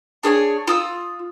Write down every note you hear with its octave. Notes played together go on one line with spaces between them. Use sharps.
D4 G#4 C#5 G#5
F4 D#6 E6